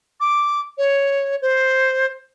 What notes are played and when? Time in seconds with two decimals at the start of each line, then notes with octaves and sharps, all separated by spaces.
0.21 D6
0.78 C#5
1.42 C5